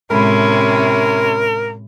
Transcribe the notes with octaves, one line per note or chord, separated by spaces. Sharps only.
A2 C3 G#3 C#4 E4 A#4 B5